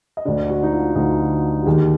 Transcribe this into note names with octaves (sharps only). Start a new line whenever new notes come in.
D#5
D2 D3 D5
F#4
D#4
F4
D2 D3 D#4
F#4
D#2 D#3 G#4